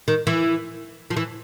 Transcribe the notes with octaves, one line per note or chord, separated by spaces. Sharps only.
D#3
E3
F3
E3